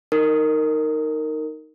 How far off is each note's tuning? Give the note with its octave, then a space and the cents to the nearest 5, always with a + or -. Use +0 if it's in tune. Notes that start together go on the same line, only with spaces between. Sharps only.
D#4 +0 A#4 -15